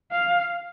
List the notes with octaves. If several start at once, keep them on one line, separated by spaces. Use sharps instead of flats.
F5